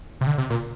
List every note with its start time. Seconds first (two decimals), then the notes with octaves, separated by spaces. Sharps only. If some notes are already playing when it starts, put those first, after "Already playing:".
0.21 C3
0.27 D3
0.38 C3
0.50 A#2